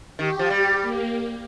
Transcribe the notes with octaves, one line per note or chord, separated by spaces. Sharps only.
D#3 G4
F3
G3 G4
A#3